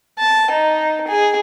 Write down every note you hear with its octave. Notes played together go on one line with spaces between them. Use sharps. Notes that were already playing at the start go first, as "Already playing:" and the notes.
A5
D#4
G#4